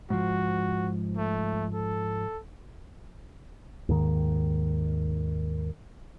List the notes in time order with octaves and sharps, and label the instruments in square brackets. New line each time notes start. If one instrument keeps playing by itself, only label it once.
[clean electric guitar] G#2 F3 [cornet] F#4
[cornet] A3
A4
[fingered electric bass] D#2 G#2 D#3